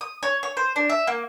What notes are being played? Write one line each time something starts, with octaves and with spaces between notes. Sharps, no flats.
D#6
C#5
C#5
C5
D4
E5
A#3